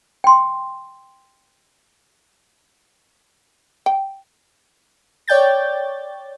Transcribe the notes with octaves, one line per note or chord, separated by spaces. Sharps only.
G5 C6
G5
C#5 D5 G5 G6 A6